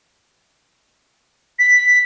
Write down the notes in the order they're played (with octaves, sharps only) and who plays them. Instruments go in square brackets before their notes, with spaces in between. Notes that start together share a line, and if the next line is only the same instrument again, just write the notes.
[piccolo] B6